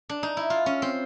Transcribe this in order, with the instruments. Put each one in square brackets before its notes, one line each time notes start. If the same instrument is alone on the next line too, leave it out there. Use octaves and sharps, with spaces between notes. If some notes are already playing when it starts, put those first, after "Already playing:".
[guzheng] D4
D#4
E4
F4
C#4
C4